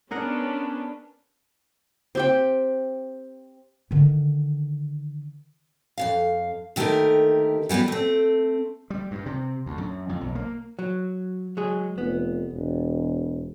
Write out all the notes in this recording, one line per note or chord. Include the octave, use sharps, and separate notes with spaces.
B3 C#4 D4 G#4 A#4 F#5
C4 G4 G5
D3 D#3
F2 E3 F5
D2 D#3 A3 A#3 G4 A#4
E3 G3 B3 F#4 B4
A3 C4
G3
G2
C3
D2
F#2
F2
B1
A#3
F#3
F#3 G#3 G#4
F1 B3
E1